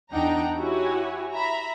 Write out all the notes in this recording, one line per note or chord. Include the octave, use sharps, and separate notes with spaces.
E2 D4 D#4 F#5 G5 A#5
E4 F#4 G4 C#5 G#5
E5 A#5 B5